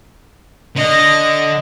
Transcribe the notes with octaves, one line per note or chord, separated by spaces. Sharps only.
D3 D#5